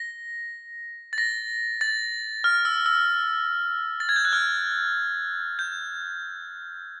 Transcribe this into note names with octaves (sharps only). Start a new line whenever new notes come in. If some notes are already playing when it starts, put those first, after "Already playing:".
Already playing: A#6
A6
A#6
A6
F6
E6
E6
A6
G#6
G6
F#6
F6
G6